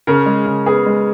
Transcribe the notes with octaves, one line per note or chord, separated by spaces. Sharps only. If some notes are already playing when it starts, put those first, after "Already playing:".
C#3 A#4
G#3
C#3
B3 G#4
G#3